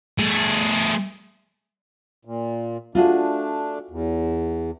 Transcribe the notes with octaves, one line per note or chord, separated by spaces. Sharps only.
A3 G#4
A#2
A3 D4 F4 F#4 G#4
E2